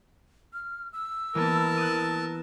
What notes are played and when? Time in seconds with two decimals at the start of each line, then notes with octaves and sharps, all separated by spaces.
0.53 F6
0.93 E6
1.35 E3 A#3 B3 A#4 A5
1.77 D#6 F#6